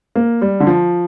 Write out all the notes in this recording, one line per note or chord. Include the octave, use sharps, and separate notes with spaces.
A#3
G3
D3
F3